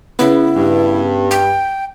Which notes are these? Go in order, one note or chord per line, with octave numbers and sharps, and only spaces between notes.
C#3 B3 E4
G2
G5